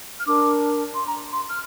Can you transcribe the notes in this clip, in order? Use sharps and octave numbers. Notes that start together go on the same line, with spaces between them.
F6
D4 A#4 D6
C6
A#5
C6
F6